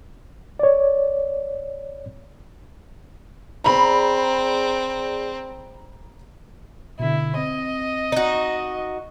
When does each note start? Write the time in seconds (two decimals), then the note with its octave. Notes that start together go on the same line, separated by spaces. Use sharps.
0.59 C#5 D5
3.64 C4 G#4 D5 A#5 B5
6.99 B2 D3 E4
7.37 C4 D#5
8.12 D#4 F#4